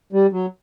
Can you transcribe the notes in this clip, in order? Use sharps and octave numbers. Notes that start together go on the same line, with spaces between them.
G3
F#3